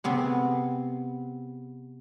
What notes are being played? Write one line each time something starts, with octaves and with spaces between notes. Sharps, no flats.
C3 B3 C4 G#4